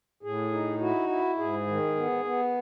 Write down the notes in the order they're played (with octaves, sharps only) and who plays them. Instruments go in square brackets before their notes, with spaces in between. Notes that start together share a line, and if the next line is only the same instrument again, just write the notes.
[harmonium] A2 G#4
D#4
E4 F#4
E4
G#2 G#4
D#3
B3
B3